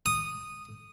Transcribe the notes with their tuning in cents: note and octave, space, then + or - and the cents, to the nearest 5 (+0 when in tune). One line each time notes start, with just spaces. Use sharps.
D#6 -10